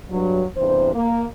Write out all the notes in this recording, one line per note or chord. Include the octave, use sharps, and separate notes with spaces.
G2 F#3
E2 G2 C3 C5
A#3